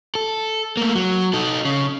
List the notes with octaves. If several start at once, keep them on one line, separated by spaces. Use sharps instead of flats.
A4
A3 A#3
F#3
D#4 A4
C#3